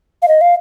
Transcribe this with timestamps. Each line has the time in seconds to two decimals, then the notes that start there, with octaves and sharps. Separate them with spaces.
0.22 F5
0.28 D#5
0.41 F5